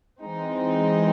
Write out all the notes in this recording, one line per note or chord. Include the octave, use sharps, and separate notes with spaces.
E3 G#3 C4 D#4